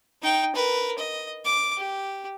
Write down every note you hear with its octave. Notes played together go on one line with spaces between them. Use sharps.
D#4 G5
A#4 B4
D#5
D6
G4